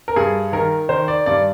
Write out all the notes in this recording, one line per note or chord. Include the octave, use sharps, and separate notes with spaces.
A#4
G2 G#4
D#3 A#4
D#3 C5
D5
G2 D5